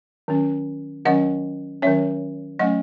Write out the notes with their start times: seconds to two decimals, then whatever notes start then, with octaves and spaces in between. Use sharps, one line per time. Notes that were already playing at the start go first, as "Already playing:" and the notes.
0.28 D#3 F#3 C#4
1.05 D#3 F#3 C#4 D#5 F#5
1.82 D#3 F#3 C#4 C#5 E5
2.59 F#3 A3 C#4 D#5 F#5